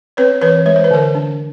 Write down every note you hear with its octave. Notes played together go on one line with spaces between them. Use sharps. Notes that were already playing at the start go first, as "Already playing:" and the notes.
C4 B4 C#5
E3 B4 C#5
G#3 C#5
C5
B4
D3 A#4 C5
D4